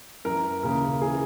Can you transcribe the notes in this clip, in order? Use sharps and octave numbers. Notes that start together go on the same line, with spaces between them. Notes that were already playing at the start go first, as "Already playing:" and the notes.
F#2 E3 A#4
D#2 C#3 E3 A#4
C#3 E3 G#4